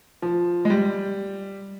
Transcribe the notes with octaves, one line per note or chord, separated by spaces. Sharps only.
F3
G#3
G3